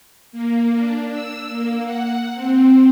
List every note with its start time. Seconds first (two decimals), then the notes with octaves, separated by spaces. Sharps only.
0.32 A#3
0.74 D4
1.12 E6
1.50 A#3
1.84 F#5
2.34 C4